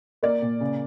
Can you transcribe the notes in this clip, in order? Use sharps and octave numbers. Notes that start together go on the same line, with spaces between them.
A#3 D5
A#2
C#3